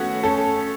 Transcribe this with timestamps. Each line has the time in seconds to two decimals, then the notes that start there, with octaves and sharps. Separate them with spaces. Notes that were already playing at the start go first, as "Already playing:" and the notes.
Already playing: A3 B3 C#4 F#4 F#5
0.23 C#4 A4 A5